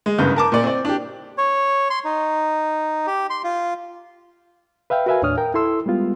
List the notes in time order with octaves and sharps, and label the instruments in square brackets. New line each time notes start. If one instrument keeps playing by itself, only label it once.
[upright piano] G#3
F#1 G2 C#3 B3 G6
A#4 A5 D6
A#2 D5
C4 D5
D4 G4
[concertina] C#5
C6
D#4
G4
C6
F4
[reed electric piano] B4 E5 F5 G5
F#4 A#4 B4 E5 F5 G#5
D#2 A2 D4 C#5 D#6 F6
A#4 G5
E4 A4 C6 E6
G3 G#3 B3 F4